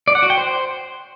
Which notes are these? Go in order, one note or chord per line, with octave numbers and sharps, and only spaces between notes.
D5
F#5
F#4
G5
C5